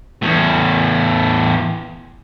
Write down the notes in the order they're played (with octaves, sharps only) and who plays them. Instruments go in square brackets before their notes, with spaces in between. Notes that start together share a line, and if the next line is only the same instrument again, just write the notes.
[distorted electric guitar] E2 A2